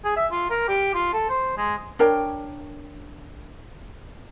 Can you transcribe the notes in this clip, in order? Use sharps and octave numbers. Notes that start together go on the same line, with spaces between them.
G#4
E5
F4
A#4
G4
F4
A4
C5
G#3
D4 A#4 C#5 G5